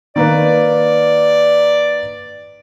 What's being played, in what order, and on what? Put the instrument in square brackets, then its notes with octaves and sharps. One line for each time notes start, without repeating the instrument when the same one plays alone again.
[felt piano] D#3 A#3 B4 [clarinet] D5